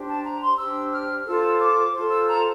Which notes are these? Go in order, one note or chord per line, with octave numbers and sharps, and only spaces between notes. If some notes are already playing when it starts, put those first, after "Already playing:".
Already playing: D4 G4 C5
A5
A#5
C6
D4 G4 C5 E6
F6
F4 A4 C5 E6
D6
F4 A4 C5
E6
A#5